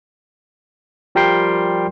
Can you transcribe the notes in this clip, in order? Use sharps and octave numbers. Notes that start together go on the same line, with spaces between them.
F3 G3 G4 A#4 G5 C6